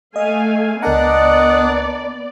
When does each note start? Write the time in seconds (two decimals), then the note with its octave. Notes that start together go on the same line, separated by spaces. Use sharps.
0.16 A3 D#5 F5 G#5
0.83 C#2 B3 D4 A#4 D5 D#5 F#5 A#5